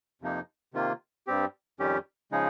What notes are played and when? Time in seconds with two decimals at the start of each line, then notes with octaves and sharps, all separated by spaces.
0.22 F2 C3 F3 A#3 D#4
0.74 C3 D#3 A#3 F4
1.27 G2 G3 C4 G4
1.79 F2 D#3 G3 C#4 G4
2.32 C#3 F3 G#3 D#4 G#4